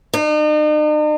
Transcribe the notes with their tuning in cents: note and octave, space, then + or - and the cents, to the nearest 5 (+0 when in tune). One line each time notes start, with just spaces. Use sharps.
D#4 -45